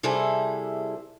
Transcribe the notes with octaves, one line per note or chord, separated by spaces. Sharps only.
C3 G3 E4 G#4 A4